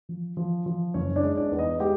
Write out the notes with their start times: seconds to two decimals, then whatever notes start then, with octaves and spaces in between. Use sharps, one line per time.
0.09 F3
0.37 F3
0.66 F3
0.94 F#1 C#4 C#5
1.16 D4 D5
1.23 G#3
1.37 D4 D5
1.51 E2
1.59 D#4 D#5
1.80 G#3 G4 G5